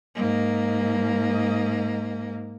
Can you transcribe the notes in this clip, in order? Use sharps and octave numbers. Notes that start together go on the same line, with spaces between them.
G#2 A#3